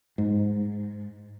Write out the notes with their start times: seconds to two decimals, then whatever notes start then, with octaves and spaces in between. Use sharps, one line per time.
0.18 G#2